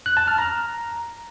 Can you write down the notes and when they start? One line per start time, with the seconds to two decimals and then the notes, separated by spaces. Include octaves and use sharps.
0.06 F#6
0.17 A5
0.28 F6
0.38 A#5